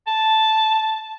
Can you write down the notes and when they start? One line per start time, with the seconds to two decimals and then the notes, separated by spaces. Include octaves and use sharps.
0.07 A5